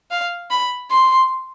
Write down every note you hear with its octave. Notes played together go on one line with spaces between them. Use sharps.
F5
B5
C6